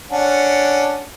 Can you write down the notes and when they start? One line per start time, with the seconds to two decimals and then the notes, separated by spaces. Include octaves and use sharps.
0.11 C#4 D4 F#5